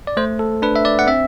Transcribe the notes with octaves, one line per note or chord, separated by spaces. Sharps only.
D5
A3 C5
A4
D4 B4
E5
D5
F#5
C4 E5